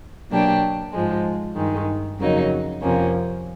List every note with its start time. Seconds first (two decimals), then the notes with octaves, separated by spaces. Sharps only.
0.31 B2 F#3 A#3 D4 G4
0.93 G#2 F3 G#3
1.56 G2 D#3 G#3
2.19 F2 C#3 F#3 A#3 D#4
2.81 F2 C3 F3 A#3 C#4